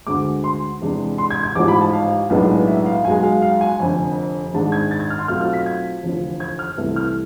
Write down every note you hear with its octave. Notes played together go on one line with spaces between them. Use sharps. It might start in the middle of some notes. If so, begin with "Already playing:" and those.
D2 D3 G#3 D6
C6
E2 C3 G#3 D4
C6
G#6
G#6
A1 G#2 F3 D6
B5
A5
F5
B1 A2 G#3 B3 D4
E5
F5
B1 B2 G#3 G#5
F5
F5
G#5
F1 F2 D3 G#5
G#1 G#2 G#3 D4 A5
G#6
A6
G#6
F6
C6
B1 B2 A3 C4 F4 F6
F6
B6
G#6
F1 E2 D3 F3
G#6
F6
C2 C3 E3 A3 E4
F6